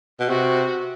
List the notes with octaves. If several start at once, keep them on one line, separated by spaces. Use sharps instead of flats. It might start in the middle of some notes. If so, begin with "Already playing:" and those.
B2
C3 F#4